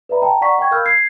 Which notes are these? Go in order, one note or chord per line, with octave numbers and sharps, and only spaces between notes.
B4 D5 E5 A#5 B5
D#5 G5 A5 A#5
D5 F#5 A#5 C#6 B6
D#5 G5 C#6 G#6
A#4 F5 B5 E6 F6 G6
G#6 C7